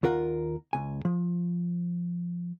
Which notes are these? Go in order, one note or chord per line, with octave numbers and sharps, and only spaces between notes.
D#2 F4 A#4 F#5
C#2 G#5
F3